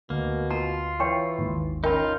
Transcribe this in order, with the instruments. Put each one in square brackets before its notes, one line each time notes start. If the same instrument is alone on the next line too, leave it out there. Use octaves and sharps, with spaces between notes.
[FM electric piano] D2 [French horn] B2 [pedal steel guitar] A#3
[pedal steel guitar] F4 [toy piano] A#5
[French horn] E3 [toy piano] C#5 G5 C#6
[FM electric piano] G#1 D#2
[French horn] C#4 [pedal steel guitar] D#4 F4 [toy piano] A#4 G5 B5